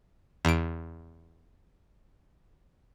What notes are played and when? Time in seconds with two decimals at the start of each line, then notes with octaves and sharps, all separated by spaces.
0.45 E2 D7